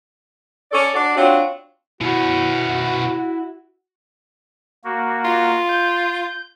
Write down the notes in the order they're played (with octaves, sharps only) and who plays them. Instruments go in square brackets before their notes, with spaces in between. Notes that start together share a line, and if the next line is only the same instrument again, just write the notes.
[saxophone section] C#4 A4 C#5 D5
D4 F#4 D5
C4 D4 F4 F#4 C#5
[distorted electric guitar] B2 C#4 [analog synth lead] E4 [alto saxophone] F#4
[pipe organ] A#3 F#4
[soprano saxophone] F4
[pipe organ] G6